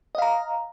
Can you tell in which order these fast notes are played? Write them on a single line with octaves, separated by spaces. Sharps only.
D#5 F5 A#5